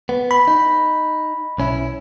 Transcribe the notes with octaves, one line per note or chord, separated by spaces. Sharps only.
B3
B5
D#4
B1 C#4 E4